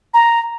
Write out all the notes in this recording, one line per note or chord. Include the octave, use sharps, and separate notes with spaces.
A#5